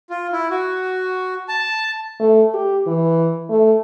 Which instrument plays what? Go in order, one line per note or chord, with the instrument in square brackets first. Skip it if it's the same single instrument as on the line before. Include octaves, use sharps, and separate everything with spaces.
[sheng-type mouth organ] F4
E4
F#4
A5
[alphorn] A3
G4
E3
A3